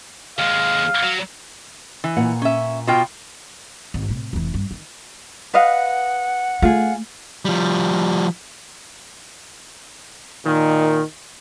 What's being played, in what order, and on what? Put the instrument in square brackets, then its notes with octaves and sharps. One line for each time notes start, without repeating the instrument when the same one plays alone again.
[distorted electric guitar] D#2 G#3 [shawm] F5
[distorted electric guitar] F#3
[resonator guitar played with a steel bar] E3
[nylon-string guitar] A#2 F#5
[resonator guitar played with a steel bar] C#4 E5
B2 F4 G5
[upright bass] G#1
A2 C3
F1 E3
G2
D#3
[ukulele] B4 D#5 F5 [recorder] F#5
[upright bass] A3 [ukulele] F4 G#4
[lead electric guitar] F3 G3
[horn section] A#2 D#3